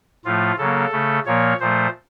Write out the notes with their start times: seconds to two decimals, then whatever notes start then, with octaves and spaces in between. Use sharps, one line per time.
0.25 A2 F3 A3 F4
0.58 C#3 F#3 A#3 A4
0.92 C#3 A3
1.26 A#2 F3 A#3 C#5
1.60 A#2 F3 A3 C5